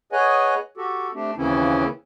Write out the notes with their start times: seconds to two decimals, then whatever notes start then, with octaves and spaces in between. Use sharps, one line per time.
0.12 G#4 B4 C#5 D#5 F#5 G#5
0.77 F#4 G4 A4
1.15 A3 C4 D4 G4
1.37 D#2 C#3 E3 C4 C#4 E4